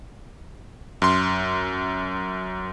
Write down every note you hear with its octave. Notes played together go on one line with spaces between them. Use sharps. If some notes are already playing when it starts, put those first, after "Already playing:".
F#2 C6